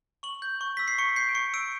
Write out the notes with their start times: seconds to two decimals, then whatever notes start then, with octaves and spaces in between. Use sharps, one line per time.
0.23 C#6 F#7
0.42 G6
0.61 C#6
0.77 E6 B6
0.88 C7
0.98 C#6 C#7
1.16 G6 C7
1.29 D7
1.35 C#6 C#7
1.54 E6 D7